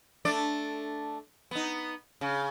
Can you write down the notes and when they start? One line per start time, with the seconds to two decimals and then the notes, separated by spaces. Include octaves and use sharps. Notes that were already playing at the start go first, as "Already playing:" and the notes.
0.25 A3 D4 D5
1.51 B3 D#4
2.21 C#3